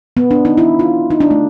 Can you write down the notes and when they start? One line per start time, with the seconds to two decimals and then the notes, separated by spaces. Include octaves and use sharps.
0.17 B3
0.31 D4
0.45 D#4
0.58 E4
0.79 F4
1.10 D#4
1.20 D4
1.31 A3